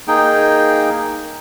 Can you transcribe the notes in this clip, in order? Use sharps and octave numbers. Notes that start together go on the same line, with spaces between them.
A#3 D#4 G#4 G5